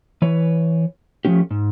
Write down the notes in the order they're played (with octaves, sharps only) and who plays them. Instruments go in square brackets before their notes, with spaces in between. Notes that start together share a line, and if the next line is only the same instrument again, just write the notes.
[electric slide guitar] E3 B4 C#5
F3 A3 C#4 G4
G#2